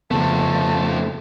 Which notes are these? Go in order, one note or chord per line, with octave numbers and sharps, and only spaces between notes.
F2 C#3 F3 A3 B3 A5